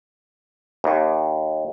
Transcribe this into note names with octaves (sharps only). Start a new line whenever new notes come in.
D#2